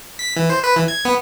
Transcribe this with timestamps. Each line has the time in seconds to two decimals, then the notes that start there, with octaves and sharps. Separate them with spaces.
0.19 B6
0.36 E3
0.50 C5
0.64 B4
0.76 E3
0.88 G#6
1.05 B3